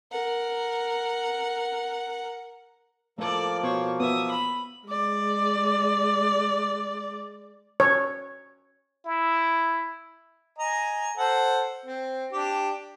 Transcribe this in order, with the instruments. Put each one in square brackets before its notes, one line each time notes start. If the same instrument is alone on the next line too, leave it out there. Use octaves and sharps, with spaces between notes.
[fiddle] A#4 F#5
[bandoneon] F3 A#3 [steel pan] A3 [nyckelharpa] A4 D5
[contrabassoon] B2 [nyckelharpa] C5 C#5
[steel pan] B3 [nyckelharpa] E5 D#6
[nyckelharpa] B5
[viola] G#3 D5
[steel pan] C#5
[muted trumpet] E4
[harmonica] D#5 G#5 A#5
A4 C5 F#5
C4
D4 G4